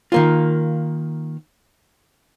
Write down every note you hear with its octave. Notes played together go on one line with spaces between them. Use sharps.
D#3 A#3 F4